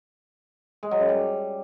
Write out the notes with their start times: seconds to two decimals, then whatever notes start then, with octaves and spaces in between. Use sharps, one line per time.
0.83 G#3
0.91 F#3
1.00 F#2
1.09 G3